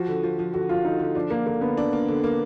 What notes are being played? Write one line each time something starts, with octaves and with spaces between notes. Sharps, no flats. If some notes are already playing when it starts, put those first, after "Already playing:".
Already playing: F3 F#4
D3
F3
F3
D3 F#4
F3 F4
D3 D#4
D3
F3 D4
F3 A#3
D3 A#3
D3 B3
D4
A#3
D3
A#3